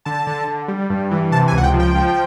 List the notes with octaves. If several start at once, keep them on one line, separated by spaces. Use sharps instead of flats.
D3 A5
D3
D3
G3
G2
E3
C3 A5
G#5
C#2
F#5
G5
F3
G5
F3